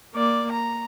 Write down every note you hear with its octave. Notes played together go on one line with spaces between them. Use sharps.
A#3 D5
A#5